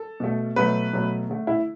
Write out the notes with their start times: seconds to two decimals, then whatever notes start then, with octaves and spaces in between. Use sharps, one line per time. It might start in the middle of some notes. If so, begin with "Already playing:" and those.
Already playing: A4
0.20 B2 A3
0.56 B2 F#3 A3 B4
0.93 B2 F#3 A3
1.29 D3 A3
1.47 E4